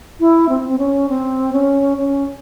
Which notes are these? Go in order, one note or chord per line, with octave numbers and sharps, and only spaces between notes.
E4
C4
C4
C#4
C4
C#4
C#4